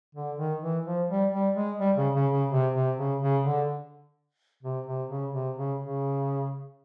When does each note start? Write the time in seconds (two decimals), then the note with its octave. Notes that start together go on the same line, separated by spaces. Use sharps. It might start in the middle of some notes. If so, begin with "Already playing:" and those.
0.15 D3
0.37 D#3
0.62 E3
0.85 F3
1.09 G3
1.32 G3
1.55 G#3
1.79 G3
1.97 C#3
2.15 C#3
2.32 C#3
2.50 C3
2.74 C3
2.98 C#3
3.21 C#3
3.45 D3
4.63 C3
4.87 C3
5.09 C#3
5.33 C3
5.57 C#3
5.80 C#3